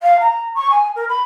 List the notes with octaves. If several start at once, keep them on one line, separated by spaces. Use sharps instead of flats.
F5
A#5
C#6
G#5
A#4
B5